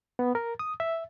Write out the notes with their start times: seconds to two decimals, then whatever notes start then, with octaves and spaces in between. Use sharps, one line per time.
0.19 B3
0.35 A#4
0.59 D#6
0.80 E5